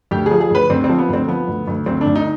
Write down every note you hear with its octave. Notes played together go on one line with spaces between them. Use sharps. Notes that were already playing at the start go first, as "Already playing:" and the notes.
D2 G4
G#4
F3
G#4
D2 B4
D2 C4
C4
F3
B3
D2 C4
F3 B3
D2
D2
D2 C4
D4
D2
D#4